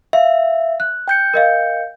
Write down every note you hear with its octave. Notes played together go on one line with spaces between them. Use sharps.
E5 F5
F#6
G5 G6 C#7
A#4 D#5 F5